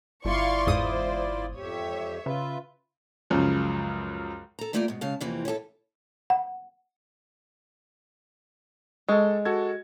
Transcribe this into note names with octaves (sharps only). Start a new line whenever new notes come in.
G1 E4 F4 D5 F5 C6 C#6
E2 G#2 C5 D#6
F2 G4 C#5 E5
C#3 F4 B4 E5
C#2 F#2 C#3 F3
A4 A#5
G3 A3 A#3 F4 A#4 D5
G#2 B2
C#3 G#3 F5 A5
F2 C3 E3 A#3 C4
C#4 E4 G4 A4
F#5
G#3 A4 C#6
F#4 A4 G#6